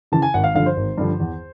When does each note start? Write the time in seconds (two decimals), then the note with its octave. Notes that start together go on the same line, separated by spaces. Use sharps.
0.12 C#3 E3 A5
0.22 G#5
0.34 G#1 F#5
0.44 F5
0.54 G2 D3 F3 F5
0.66 C5
0.77 G#1
0.98 G2 D3 F3
1.20 E2